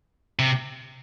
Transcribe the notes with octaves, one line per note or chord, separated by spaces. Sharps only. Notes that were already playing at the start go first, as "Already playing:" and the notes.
C3